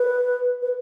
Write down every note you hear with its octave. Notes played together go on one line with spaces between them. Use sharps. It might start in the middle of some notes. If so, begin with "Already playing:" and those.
Already playing: B4
B4